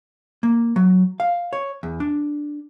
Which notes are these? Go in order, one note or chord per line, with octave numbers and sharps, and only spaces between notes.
A#3
F#3
F5
C#5
E2
D4